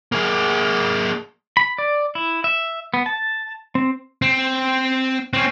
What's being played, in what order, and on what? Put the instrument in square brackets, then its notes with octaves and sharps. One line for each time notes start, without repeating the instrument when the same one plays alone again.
[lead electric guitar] A#3 G#4
[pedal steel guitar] B5
D5
E4
E5
B3
A5
C4
[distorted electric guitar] C4
C4 C#4